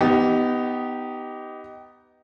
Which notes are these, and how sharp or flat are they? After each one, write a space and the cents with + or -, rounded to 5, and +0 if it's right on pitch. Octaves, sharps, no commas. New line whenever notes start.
B3 +10 D#4 +5 G4 -15